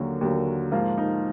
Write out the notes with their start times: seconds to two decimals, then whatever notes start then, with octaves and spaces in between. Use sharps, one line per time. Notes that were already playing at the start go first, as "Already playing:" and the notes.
Already playing: D#2 D3 F#3 A#3 F#4
0.21 D#2 D3 F#3 A#3
0.72 G#2 F3 A#3 F4
0.98 D#4